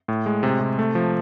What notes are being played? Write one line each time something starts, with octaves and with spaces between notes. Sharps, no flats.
A2
G#3
C3
C3
A3
F3